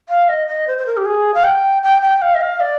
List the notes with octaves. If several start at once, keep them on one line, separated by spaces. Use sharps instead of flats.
F5
D#5
D#5
C5
C5
A#4
G4
G#4
F5
G5
G5
G5
F5
D#5
F5
D5